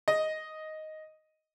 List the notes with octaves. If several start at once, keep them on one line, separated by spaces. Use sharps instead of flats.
D#5